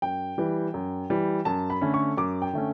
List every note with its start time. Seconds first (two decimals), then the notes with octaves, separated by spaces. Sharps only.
0.02 F#2 G5
0.38 E3 G3
0.74 F#2
1.10 E3 G3
1.45 F#2 A5
1.70 B5
1.81 D3 A3 C#4
1.94 C#6
2.18 F#2 D6
2.42 G5
2.53 D3 A3 C#4